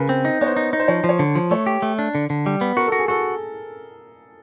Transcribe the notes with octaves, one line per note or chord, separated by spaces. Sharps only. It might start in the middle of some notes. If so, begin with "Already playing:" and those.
Already playing: C#3 A#4 B4
C4
D#4
B3 C#5
C5
D#4
D#4
C5
F3 C#5
F3
C#5
D3
F3
A3 C#5
G4
A3
D4
D3
D3
G3
B3
F#4 A#4
F#4 A4
G#4
F#4 A4